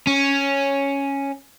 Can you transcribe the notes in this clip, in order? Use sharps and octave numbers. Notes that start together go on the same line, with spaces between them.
C#4